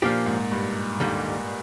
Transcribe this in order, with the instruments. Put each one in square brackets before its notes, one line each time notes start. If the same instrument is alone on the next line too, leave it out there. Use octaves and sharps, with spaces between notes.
[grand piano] A#2 [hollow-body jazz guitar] F3 A#3 D4 G4
[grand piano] G#2
G2
[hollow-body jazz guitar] D#2 D3 G3